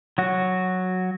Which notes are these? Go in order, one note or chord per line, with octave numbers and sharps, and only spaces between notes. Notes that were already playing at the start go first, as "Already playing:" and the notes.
F#3 F#4